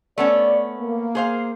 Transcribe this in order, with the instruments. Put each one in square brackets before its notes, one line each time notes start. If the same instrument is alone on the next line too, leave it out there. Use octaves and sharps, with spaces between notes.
[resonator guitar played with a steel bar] A3 B3 C#4 [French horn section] D5
[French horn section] A#3
[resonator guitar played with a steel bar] G#4 C5 F5